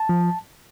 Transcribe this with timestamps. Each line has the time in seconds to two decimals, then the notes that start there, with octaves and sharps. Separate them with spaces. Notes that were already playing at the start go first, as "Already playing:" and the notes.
Already playing: A5
0.09 F3